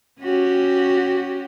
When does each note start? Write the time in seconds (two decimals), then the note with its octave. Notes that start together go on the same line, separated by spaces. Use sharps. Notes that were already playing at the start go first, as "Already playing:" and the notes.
0.21 C#4 F#4 G4